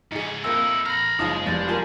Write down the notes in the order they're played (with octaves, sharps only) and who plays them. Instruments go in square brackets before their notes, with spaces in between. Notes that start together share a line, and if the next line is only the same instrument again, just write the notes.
[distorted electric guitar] G#2 C#4 [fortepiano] D#4 G#4
[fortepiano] F2 A#3 [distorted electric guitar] D#4 E4 [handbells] E6
[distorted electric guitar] A#5 B5 [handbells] F6 A#6
[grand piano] F#1 F4 [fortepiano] F3 A5 D#6 [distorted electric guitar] G#3 [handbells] D#4
[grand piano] F1 G3 A6
[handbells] F4 A#4 [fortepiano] G#5 A5 C6